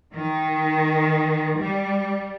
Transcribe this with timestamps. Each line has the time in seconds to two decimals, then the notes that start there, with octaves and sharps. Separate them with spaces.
0.13 D#3
1.59 G3